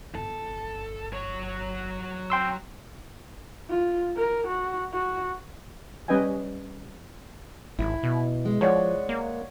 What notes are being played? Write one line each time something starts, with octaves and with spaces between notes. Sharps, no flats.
G1 A4
F#3 C#5
G5 C6 E6
F4
A#4
F#4
F#4
G3 C#4 B4 D#5 G5 G#5
G#1 E4
B2
G#3
F3 C#5 D5 F#5
A#3